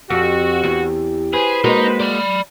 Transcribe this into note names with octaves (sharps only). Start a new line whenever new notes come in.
F2 F#4 G4
E2
G#4 B4 C5
G#3 A#3 D#4 F#4
D5 B5